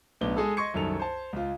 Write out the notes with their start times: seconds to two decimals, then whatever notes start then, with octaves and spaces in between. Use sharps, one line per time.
0.21 B1 A2 B3 D4 G7
0.37 G#3 G#4 A4
0.57 D#5 C6 C#6 G#6 C#7
0.74 C2 F#2 D#3 A4 F7
1.00 C5 A5
1.33 C#2 F4